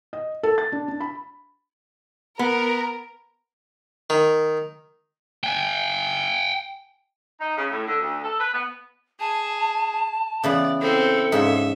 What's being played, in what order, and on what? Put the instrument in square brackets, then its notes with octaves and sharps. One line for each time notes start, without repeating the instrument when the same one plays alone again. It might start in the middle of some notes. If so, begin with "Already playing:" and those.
[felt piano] D#5
A4
A6
D4
D4
B5
[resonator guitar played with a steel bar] B3 [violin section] A#4
[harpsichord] D#3
[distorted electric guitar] G5 G#5
[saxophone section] D#4
C#3
A2
D3
D2
A4
B4
B3
[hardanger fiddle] G#4 [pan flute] A5
[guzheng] C#3 E3 B3 [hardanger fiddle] D5
[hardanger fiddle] C4 E4 [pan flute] A4
[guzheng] G#2 C#3 F3 [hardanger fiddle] E5